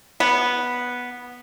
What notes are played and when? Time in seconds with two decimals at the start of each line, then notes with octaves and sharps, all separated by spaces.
0.20 B3